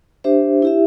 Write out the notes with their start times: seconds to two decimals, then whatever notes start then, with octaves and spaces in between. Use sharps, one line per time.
0.24 D4 G4 C5 E5
0.62 E4 G4 E5